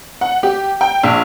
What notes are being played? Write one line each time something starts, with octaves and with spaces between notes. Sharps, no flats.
F#5
G4
G5
A#1